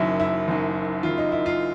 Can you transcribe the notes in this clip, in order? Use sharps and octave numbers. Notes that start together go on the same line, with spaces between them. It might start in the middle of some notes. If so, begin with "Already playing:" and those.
Already playing: F#1 F#2 D#3 F#3 E4
E4
F#1 F#2 D#3 F#3
F#1 F#2 D#3 F#3 F4
D#4
E4
F4